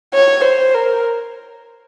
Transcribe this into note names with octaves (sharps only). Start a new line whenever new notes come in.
C#5
C5
A#4